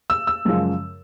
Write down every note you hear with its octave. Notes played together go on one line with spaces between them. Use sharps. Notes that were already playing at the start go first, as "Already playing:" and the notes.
E6
E6
F#2 C#3 F3 G#3